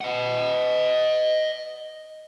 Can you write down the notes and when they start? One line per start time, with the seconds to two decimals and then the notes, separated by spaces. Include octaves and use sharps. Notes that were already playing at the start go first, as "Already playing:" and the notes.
0.01 D#5 F#5